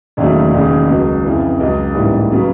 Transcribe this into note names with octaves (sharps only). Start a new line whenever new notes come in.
E1 D#2 C#3 F#3 A3
E1 D#2 C#3
C#2 B2 F#3
F2 C#3 E3
C#2 C#3 F#3
A1 G#2 E3 G3 A#3
C#3 F#3 B3